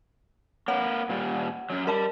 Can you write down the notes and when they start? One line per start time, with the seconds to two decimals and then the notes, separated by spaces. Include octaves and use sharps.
0.68 A#3 B4 C#5 F#5
1.09 A#2 G3
1.70 F#2 F#3
1.87 G3 A#4 D#5 A5